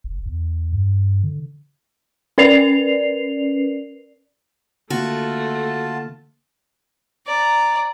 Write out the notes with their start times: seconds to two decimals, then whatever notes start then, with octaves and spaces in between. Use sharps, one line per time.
0.04 F#1
0.26 E2
0.72 G2
1.23 D3
2.38 C#4 A#4 B4 D5 C7 F7
4.90 D3 A3 A#3 F4 F#4 A5
7.27 D5 A#5